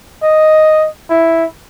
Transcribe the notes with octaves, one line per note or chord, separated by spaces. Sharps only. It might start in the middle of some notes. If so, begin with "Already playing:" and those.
D#5
E4